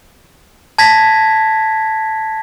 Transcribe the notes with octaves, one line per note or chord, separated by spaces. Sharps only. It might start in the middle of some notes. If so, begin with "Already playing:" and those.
A5 G#6 A#6 B6